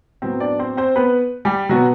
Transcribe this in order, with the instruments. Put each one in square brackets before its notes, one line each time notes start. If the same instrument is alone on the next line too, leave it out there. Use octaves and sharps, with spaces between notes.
[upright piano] A2 F#3 B3 C4 C5
D4 D5
C4 C5
C4 C5
B3 B4
G3 G4
B2 F#3 B3 F#4